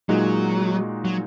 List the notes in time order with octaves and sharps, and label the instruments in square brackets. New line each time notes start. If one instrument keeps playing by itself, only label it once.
[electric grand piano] A#2 G#3 D#4 F#4 [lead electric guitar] F#3
[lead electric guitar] F#3